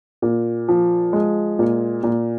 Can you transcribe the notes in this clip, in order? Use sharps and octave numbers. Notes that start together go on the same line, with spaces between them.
A#2
F3
G#3
A#2
A#2